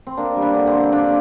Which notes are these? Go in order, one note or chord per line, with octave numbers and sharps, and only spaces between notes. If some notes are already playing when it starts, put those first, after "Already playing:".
C4
A#3 D4
G3
D4
D3
C4
D3
A#3 D4